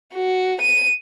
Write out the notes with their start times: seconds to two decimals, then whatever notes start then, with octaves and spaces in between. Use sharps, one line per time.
0.13 F#4
0.61 D#7